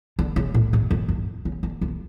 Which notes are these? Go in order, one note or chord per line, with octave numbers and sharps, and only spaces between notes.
D3
C#3
A2
G#2
F2
F#2
C#3
D3
F2